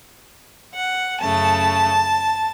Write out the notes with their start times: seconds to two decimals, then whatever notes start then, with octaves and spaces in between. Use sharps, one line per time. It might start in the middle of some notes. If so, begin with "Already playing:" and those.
0.75 F#5
1.21 F#2 C#3 A3 A5